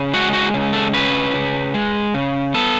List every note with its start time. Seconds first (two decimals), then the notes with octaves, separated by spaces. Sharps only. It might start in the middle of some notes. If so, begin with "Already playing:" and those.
Already playing: C#3
0.14 G#3 F#4
0.33 F#4
0.54 C#3
0.73 A4
0.94 C#4 B4
1.34 C#3
1.74 G#3
2.14 C#3
2.54 B3 A4